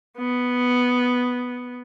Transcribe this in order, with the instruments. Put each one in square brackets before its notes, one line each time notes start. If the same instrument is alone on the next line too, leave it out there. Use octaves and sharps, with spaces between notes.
[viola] B3